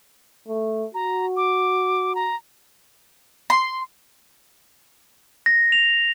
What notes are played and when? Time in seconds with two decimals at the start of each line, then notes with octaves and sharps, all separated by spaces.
0.48 A3
0.94 F#4 A#5
1.37 D6
2.15 A#5
3.50 C6
5.46 A#6
5.72 F7